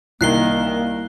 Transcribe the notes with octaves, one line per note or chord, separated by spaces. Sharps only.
C2 D#3 A#3 F#6 C7 G7